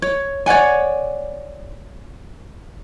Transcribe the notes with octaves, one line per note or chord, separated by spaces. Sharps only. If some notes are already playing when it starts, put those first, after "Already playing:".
C#5
C#5 D5 F#5 G#5